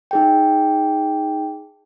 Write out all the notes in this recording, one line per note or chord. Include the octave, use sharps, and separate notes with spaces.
D#4 G#4 G5